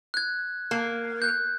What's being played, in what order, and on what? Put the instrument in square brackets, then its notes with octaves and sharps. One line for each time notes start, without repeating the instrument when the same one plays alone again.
[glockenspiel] F#6 G#6
[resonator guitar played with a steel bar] A#3
[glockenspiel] F#6 G6